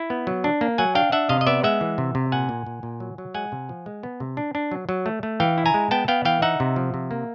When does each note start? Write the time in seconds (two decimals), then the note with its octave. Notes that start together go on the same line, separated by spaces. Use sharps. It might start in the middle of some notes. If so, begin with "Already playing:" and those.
Already playing: E4
0.10 B3
0.27 F#3
0.44 D4
0.61 A#3
0.78 F#3 F#5 G#5
0.95 D4 F5 G5
1.12 D4 E5 F#5
1.29 C3 D#5 F5
1.41 D#5
1.47 B3 D5 E5
1.64 G#3 E5 F#5
1.81 E3
1.98 C3
2.15 C3
2.32 A#2 F#5 G#5
2.49 A#2
2.67 A#2
2.83 A#2
3.00 F#3
3.18 F#3
3.34 G#3 F#5 G#5
3.52 C3
3.69 F3
3.86 G#3
4.03 B3
4.20 C3
4.37 D4
4.55 D4
4.71 F#3
4.89 F#3
5.06 A3
5.23 A3
5.40 E3 F5 G5
5.58 E4
5.66 G#5 A#5
5.74 G#3
5.91 B3 G5 A5
6.08 B3 F5 G5
6.25 E3 F5 G5
6.42 D#4 E5 F#5
6.60 C3
6.76 F3
6.94 C3
7.11 A#3